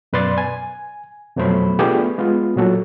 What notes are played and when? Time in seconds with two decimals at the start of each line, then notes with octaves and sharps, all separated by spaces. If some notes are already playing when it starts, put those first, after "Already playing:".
0.13 F#2 B2 B4 D5 C6 A6
0.38 G#5
1.36 F2 B2 F#3 A3 C5 B5
1.79 A3 B3 D4 F4 G4 G#4
2.18 G#3 B3 F4
2.56 A#2 F#3 F#4 A4